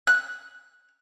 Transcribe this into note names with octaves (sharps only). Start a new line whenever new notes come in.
F#6